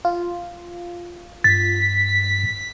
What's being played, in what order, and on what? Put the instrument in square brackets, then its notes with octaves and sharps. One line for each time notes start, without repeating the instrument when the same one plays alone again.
[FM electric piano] F4
[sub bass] G2 [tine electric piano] A6 [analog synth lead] B6